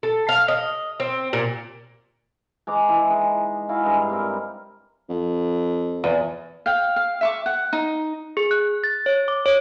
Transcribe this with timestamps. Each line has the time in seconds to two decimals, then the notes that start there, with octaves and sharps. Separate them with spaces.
0.03 A4
0.29 F5
0.48 D#5
1.00 C4
1.33 A#2
2.67 G#3 A#5 D6
2.88 E3 G#3
3.10 G#3 D#4
3.69 E4 F#4 F5 G#5
3.83 G2 G#3 A#5
4.10 G3 C4 A#4
5.09 F2
6.04 E2
6.66 F5 G5
6.96 F5
7.21 E5 C#6 D6
7.46 F#5
7.73 D#4
8.37 G#4
8.51 F#6
8.84 A6
9.06 C#5
9.28 D6
9.46 C#5